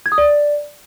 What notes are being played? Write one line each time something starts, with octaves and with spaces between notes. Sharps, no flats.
G#6
D#6
D5